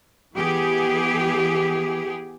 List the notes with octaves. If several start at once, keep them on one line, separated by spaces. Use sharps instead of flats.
E3 B3 G4 G#4